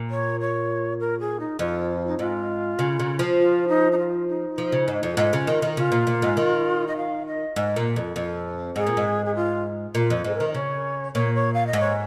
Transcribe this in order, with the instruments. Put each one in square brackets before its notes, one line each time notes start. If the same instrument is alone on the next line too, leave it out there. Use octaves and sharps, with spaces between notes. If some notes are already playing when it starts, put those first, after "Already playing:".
Already playing: [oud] A#2
[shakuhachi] C#5
C#5
A#4
G#4
D#4
[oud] F2 [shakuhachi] F4
[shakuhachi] D#4
[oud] G#2 [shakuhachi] F4
[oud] C#3
C#3
F3
[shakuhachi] F4
D#4
D#4
F4
D#4
[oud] F3
C#3
G#2
F2
[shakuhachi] G#4
[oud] G#2 [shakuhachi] F4
[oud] C#3
D#3
D#3
[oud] C#3 [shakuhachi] F4
[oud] A#2
A#2
G#2
D#3
[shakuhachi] D#5
F5
D#5
[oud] G#2
A#2
F2
F2
[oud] G#2 [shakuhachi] G#4
[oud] A#2
G#2
[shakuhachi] G#4
F4
[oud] A#2 [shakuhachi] F4
[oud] F2
[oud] G#2 [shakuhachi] G#4
[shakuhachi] A#4
[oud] D#3
[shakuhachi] D#5
[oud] C#3 [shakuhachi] C#5
[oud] A#2 [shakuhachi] C#5
[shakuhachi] C#5
F5
D#5
[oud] G#2
[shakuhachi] C#5